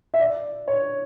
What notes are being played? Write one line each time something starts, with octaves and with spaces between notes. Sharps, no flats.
E5
D5
C#5